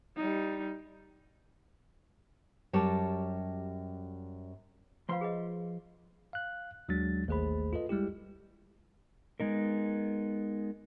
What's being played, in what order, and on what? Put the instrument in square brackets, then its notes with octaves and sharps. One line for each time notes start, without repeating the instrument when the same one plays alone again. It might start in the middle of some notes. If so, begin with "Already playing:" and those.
[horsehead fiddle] G3 D#4
[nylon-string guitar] F#2 G3 G4 C#5 A5
[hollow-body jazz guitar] F3 C6 [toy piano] F4 B4 F5
[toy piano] G#4 B4 D#5
[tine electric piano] F5 F#6
D#2 F#3 G#3 D4 F#4 A6
A1 D#2 A3 G#4 C5 B5
F4 A4 B4 D#5
G3 G#3 E4 G4
[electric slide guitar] G#3 B3 D#4 A#4